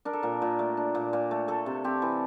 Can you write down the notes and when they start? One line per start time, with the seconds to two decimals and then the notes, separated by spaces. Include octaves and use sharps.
0.05 D4 A#4
0.13 A4
0.23 A#2 A#4
0.42 A#2
0.59 A3
0.77 D4
0.95 A#2
1.13 A#2
1.31 A3
1.48 A3 A4
1.66 C3
1.84 C4 G4
2.02 E3